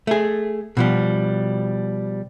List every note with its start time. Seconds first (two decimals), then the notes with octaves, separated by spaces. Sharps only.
0.07 A3 G#4
0.77 B2 F3 G3